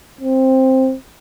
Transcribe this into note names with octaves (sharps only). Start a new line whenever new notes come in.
C4